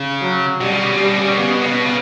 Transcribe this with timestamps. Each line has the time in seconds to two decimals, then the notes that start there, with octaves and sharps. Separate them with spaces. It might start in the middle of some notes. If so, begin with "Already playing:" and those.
Already playing: C#3
0.22 F#3
0.61 B2 G3
0.71 C#3
0.83 B2
0.95 C#3 G3
1.05 B2
1.17 C#3
1.28 B2
1.38 C#3 B3
1.50 B2
1.62 C#3
1.72 B2
1.84 C#3